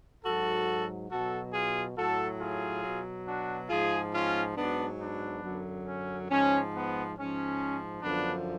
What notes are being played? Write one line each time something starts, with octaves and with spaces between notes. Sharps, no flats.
G#2 F#3 F#4 A4
B2 F#3 F#4 A4
F4 G#4
A2 F#3 F#4 A4
F4 G#4
B2 F#3
D4 F#4
G#2 F3 F4 G#4
C#4 F4
G#2 B3 D4
F#3
B3 D4
F#2 D3 F#3
C#4
G#2 F3 C#4
B3
G#2 F3 C#4
F#2 D3 F3 B3 D4